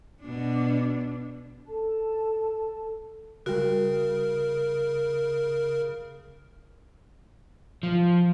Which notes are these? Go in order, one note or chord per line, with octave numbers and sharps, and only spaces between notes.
B2 D4
A4 A5
C#3 G3 F#4 A#4
F3